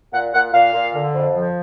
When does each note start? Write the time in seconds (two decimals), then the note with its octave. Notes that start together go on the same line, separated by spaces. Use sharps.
0.12 A#2 F#5
0.33 A#2 F#5
0.53 A#2 F5
0.74 A#2
0.95 D3
1.14 F2
1.35 F3